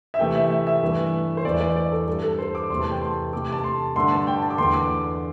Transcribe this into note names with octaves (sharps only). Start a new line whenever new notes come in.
E5
C3 E3 A3 G5
E5
E5
E5
G2 E3 A3
C5
E2 E3 A3 D5
D5
D5
A4
G2 G3 A4
A4
C5
D6
E2 C3 A3 C6
A5
G5
C6
C3 A3 D6
A5
C6
G2 D3 A3 C6
A5
G5
A5
D6
E2 D3 A3 C6
D6